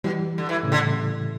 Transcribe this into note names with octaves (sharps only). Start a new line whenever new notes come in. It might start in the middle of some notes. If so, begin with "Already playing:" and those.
B2 E3 G3
D3
E3
A2 C#3
D3